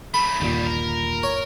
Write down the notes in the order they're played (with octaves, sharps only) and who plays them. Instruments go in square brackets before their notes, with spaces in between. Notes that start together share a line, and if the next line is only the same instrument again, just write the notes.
[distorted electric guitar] F#3 A3 [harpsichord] B5
[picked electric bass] G1 D#2 A#2 [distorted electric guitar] D#3 G3
[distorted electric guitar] A#4
[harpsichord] C#5